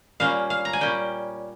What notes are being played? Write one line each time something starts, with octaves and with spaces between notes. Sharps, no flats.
A#2 G3 C#4 F5
F5
A#5
G#5
A#2 G3 C#4 G5